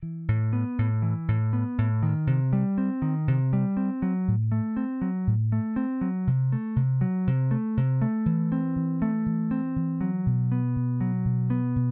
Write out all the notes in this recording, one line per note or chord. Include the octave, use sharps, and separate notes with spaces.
E3
A2
B3
A2
E3
A2
B3
A2
D#3
C3
G3
C4
D#3
C3
G3
C4
F#3
A2
A3
C4
F#3
A2
A3
C4
F#3
C3
A3
C3
F#3
C3
A3
C3
A3
E3
C4
E3
A3
E3
C4
E3
F#3
B2
B3
B2
F#3
B2
B3
B2